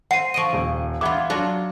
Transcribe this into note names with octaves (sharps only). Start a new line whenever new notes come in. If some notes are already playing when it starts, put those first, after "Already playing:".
C4 F#5 C7 D#7
F3 D#5 C#6 D7 D#7
D#1
E3 F4 E5 F#5 D6 G#6
F#3 D4 F4 F#4